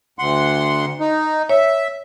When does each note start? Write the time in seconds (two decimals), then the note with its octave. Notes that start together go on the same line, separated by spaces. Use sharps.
0.19 D2 F#5 C6
1.00 D#4
1.49 C#5 E5